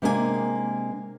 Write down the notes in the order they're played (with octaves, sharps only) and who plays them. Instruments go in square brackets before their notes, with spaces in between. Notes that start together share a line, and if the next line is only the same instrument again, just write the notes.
[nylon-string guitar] C3 G#3 A#3 D4 C5 G#5